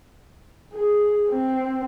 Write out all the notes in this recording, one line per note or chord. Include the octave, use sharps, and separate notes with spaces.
G#4
C4